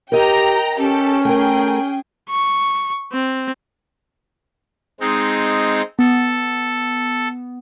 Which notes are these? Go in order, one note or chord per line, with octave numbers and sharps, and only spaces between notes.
G4 A#4 D#5 G5 A#5
C#4 G4 A4
A3 G#4 A#4 G5
C#6
C4
G#3 C4 D#4
B3 A4